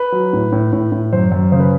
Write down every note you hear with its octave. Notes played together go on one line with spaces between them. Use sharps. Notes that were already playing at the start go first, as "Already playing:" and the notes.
Already playing: B4
F#3
A2
A2
A2
A2
F#2 C5
F#2
C#3 C5
B4